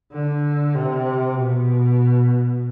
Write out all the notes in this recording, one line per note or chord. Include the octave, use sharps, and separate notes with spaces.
D3
C3
B2